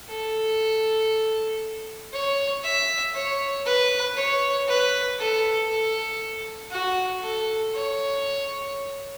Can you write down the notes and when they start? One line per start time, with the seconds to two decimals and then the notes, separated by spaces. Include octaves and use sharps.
0.08 A4
2.13 C#5
2.64 E5
3.14 C#5
3.66 B4
4.16 C#5
4.68 B4
5.19 A4
5.70 A4
6.71 F#4
7.22 A4
7.73 C#5